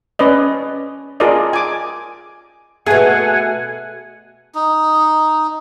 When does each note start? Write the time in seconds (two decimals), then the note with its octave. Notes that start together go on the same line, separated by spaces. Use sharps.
0.19 C#4 B4 D5 D#5
1.20 F4 G#4 A#4 D5 D#5
1.53 G#5 D6
2.86 B2 A3 G#4 F#5 G#5
4.55 D#4